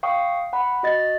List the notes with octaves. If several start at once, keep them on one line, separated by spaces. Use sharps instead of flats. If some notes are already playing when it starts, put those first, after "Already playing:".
F5 G5 C#6 D#6
F#5 B5
F#4 D#5 A6